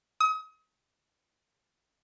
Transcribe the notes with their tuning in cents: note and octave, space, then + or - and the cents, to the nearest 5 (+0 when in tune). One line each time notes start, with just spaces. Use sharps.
D#6 +35